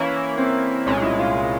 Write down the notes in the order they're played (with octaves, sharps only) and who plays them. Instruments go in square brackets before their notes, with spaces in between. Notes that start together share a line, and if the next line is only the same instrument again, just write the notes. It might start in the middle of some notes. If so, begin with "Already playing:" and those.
Already playing: [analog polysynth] E3 A#3 E4 [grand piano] C#4
[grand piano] C4
[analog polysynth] C2 A#2 G#3 [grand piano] C#4
[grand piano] E4
F4